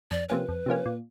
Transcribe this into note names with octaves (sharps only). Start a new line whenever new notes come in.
F2 D5
C3 F3 A#3 C#4 B4
F2
C3 F3 A#3 C#4
A#2